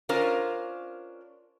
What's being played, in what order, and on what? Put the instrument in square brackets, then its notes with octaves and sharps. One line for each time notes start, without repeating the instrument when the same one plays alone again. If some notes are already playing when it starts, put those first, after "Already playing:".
[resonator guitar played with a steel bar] C#4 D4 F4 A#4 C5